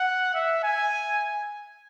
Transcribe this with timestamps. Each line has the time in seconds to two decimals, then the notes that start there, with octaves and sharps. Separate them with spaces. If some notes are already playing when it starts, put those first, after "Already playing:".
Already playing: F#5
0.34 E5
0.64 G#5